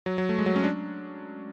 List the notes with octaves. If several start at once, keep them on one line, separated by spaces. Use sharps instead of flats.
F#3
F#3
A3
G#3
F#3
C#4
D4